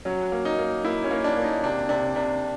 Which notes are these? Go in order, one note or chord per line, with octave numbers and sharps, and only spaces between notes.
F#3 C#4
A#3
D#4
A#3
A#3 E4
C#4
A#3
D4
A#3
D#4
C3 D4
C3 D4
C3 D4